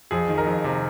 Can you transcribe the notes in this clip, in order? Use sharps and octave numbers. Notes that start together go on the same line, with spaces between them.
F2 G#4
D#3
A#4
F2
C3